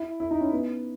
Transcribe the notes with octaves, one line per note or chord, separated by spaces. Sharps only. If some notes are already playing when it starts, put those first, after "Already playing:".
Already playing: E4
E4
D#4
C#4
B3